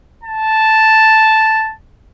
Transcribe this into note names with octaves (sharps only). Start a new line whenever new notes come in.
A5